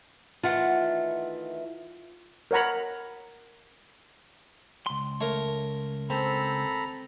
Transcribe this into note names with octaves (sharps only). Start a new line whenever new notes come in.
D#3 E3 A3 F4 F#5
A#4 C#5 F#5 A#5 B5
C#2 C6
A3 A#4 C#5 F5
C4 A4 A#5 B5